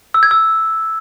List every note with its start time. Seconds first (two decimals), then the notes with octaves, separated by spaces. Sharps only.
0.14 E6
0.23 G#6
0.31 E6